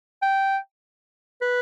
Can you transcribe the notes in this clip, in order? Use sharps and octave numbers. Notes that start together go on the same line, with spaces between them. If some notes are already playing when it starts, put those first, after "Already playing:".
G5
B4